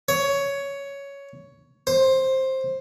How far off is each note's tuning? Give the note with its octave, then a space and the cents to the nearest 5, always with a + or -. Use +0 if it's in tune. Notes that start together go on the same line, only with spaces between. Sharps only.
C#5 +10
C5 +10